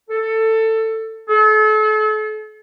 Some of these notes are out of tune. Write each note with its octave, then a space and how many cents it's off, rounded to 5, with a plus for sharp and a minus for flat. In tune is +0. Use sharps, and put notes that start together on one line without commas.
A4 +15
A4 -40